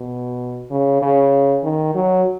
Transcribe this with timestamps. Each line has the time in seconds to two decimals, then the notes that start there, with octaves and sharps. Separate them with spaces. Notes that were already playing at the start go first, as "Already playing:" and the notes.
Already playing: B2
0.71 C#3
1.02 C#3
1.63 D#3
1.95 F#3